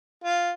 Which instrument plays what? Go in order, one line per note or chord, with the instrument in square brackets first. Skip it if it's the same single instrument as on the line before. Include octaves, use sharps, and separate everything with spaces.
[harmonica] F4